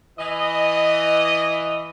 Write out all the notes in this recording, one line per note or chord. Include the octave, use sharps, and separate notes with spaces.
E3 D#5